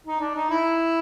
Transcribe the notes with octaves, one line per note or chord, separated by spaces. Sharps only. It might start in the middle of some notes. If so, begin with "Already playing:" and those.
D#4
D4
D#4
E4